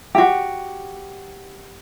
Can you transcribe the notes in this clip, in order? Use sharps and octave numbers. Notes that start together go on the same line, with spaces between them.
F#4 G4